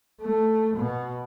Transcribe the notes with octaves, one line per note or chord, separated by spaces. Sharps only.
A3
B2